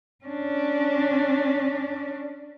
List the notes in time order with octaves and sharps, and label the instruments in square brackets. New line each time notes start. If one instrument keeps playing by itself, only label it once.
[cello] C#4 D4